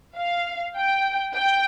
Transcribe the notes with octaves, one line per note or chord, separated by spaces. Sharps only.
F5
G5
G5